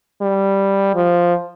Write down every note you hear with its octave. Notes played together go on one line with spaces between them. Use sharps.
G3
F3